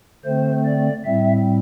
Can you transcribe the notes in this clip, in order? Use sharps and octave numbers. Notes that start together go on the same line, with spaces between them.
D3 A3 C4 C5
D5
A2 G3 C4 E5